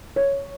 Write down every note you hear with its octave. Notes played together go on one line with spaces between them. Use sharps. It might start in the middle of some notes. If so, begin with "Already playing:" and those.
C#5